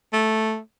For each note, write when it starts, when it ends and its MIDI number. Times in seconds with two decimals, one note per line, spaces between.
0.13 0.59 57